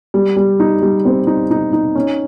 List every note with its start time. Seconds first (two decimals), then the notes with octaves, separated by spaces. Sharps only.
0.14 G3
0.37 G3
0.60 D#4
0.82 G3
1.05 C4
1.27 D#4
1.51 D#4
1.73 D#4
1.95 C#4